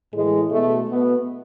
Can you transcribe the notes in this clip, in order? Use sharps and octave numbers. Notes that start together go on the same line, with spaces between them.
A2 E3 G#3
B2 A3
B2 B3